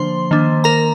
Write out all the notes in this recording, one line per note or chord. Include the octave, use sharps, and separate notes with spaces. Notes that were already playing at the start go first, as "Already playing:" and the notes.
Already playing: D3 F3 A#3 D4 C5 C6
D#3 A#3 D4
A#4 A#5